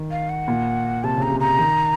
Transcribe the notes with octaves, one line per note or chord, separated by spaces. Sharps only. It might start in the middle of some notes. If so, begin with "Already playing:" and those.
Already playing: D#3
F5
F#5
A#2
C3 A5
C#3 A#5
C3
A#5
D#3